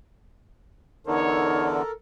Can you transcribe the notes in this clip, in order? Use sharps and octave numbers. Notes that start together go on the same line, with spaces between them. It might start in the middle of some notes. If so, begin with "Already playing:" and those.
E2 D3 D#4 A4 A#4 C#5